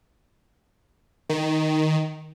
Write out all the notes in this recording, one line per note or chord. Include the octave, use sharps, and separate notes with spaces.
D#3